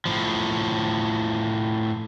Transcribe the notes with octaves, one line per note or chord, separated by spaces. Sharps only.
A2 F3